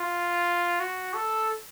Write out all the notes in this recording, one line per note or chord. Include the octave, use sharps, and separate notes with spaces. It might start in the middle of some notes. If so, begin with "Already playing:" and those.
Already playing: F4
F#4
A4